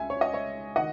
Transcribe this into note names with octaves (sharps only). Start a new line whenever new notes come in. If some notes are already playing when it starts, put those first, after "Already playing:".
Already playing: C#2 E5 G#5
C#5
D#5
C#5 E5
D#3 D#5 F#5